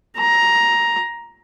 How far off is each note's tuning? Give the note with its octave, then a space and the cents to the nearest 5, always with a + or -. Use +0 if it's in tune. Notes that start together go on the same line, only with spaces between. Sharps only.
A#5 +10